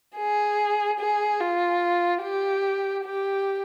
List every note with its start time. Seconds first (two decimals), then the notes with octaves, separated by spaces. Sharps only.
0.16 G#4
1.00 G#4
1.40 F4
2.22 G4
3.04 G4